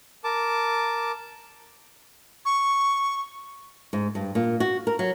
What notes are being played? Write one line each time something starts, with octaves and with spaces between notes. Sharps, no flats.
A#4 A5 D6
C#6
G#2
G2
A#2
F#4
A#4
F#3